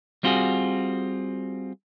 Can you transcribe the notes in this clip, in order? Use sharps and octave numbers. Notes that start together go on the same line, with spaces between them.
G3 C4 F4 F#4 G#4